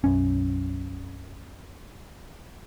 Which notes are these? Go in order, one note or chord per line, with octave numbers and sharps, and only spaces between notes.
B1 F#2 C#4